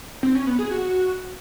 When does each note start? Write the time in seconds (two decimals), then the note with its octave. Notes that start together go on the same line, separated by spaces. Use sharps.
0.23 C4
0.35 C#4
0.47 B3
0.59 G#4
0.71 F#4